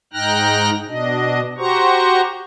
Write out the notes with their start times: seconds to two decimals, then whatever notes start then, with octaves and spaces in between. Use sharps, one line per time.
0.13 G#2 D#4 G5 F6 F#6 A#6
0.88 B2 D4 D#5
1.58 F#4 G4 C5 A#5 C#6